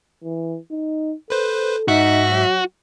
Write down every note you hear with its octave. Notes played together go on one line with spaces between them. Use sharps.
E3
D#4
A4 B4 C5
G#2 D#4 F#4 E5
F#3